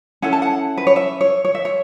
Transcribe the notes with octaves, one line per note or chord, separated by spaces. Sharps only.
C#4 E4 A4 F#5
A5
F#5
B4
C#5
E5
C#5
C#5
E5
C#5